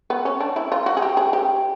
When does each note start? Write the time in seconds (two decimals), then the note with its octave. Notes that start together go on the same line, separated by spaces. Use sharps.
0.10 B3
0.25 C#4
0.40 D4
0.56 E4
0.72 F4
0.86 F#4
0.97 G#4
1.02 G4
1.17 G#4
1.33 G4